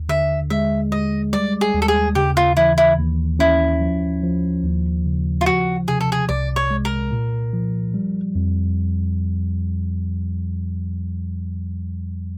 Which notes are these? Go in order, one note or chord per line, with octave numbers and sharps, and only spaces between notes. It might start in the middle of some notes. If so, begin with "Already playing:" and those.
Already playing: D#2
D3 E5
G#3 E5
G#3 D#5
G3 D5
G#4
D#2
A4
G#4
C#3 G4
F4
E3 E4
E4
D#2
C#4 E4
F3
F3
D#2
C#3
F4
F3 F#4
C3 G#4
A4
G#4
C2 D5
C#5
G#3
A#4
A#2
F3
G3
F2